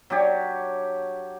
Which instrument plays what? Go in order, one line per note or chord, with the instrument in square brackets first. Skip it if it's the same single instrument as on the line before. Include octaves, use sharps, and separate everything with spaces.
[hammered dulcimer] F#3 D4 G4 C#5